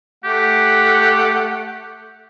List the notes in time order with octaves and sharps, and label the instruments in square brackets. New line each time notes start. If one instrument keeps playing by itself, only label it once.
[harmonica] A3 F#5 [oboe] G4